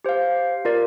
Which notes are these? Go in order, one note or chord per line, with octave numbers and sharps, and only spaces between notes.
G4 C5 F5
F4 A#4 D5